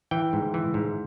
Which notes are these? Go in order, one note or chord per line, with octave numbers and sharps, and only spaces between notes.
E3 G5
G#2
E3
G#2